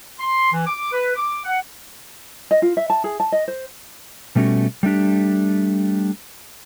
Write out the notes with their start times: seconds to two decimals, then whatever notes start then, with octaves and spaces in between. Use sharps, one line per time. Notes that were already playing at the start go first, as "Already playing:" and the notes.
0.20 C6
0.53 E3
0.67 D6
0.93 B4
1.16 D6
1.45 F#5
2.51 D#5
2.62 F4
2.77 E5
2.90 A5
3.04 G#4
3.20 A5
3.32 D#5
3.48 C5
4.35 B2 G3 A3 C#4 F#4
4.83 G3 A3 D4 G4